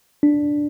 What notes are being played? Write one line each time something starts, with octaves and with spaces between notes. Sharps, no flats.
D4